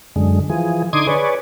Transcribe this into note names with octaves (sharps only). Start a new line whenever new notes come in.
F#2 D3 G#3
E3 F3 G#4
D3 D#4 C6 D6 D#6 G#6
G#4 B4 C#5 D5